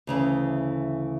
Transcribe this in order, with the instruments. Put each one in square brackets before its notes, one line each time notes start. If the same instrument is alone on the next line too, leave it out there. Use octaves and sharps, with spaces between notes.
[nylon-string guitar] D2 C#3 E3